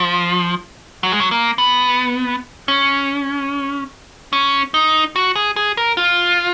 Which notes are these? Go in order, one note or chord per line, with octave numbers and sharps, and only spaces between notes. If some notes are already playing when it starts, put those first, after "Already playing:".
Already playing: F3
F#3
G#3
F#3
A#3
B3
C#4
C#4
D#4
F#4
G#4
G#4
A#4
F4